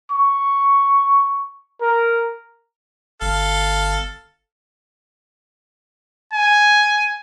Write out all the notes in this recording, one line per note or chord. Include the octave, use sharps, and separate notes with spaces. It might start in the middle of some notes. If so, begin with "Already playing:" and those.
C#6
A#4
G1 A4 F5
G#5